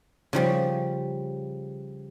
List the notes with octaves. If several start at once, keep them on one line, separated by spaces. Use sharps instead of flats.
C#3 F3 G3